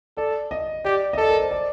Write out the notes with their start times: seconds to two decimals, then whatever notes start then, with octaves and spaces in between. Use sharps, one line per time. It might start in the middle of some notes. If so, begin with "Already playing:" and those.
0.17 A4 D5
0.51 D#5
0.84 G4 D5
1.13 D#5
1.18 A4 D5
1.29 A#4
1.40 C5
1.51 D5